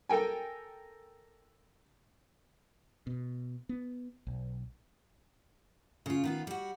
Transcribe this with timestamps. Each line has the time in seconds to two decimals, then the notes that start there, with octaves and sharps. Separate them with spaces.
0.09 A4 A#4 G5 G#5
3.07 B2
3.69 B3
4.27 B1
6.06 C#3 F4
6.24 D#3 B3 F4
6.47 G3 F#4